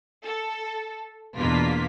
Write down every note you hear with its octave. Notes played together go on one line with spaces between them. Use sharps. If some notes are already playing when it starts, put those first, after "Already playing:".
A4
E2 B2 A#3 D4 F4 B6